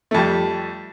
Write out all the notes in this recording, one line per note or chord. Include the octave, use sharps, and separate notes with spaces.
F2 G3 A3